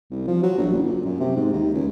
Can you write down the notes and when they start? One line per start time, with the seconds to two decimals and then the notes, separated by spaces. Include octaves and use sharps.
0.11 C2
0.27 F3
0.43 F#3
0.58 A#1
0.73 F#1
0.87 A#2
1.05 F#2
1.20 C3
1.36 G#2
1.53 D#2
1.74 C#2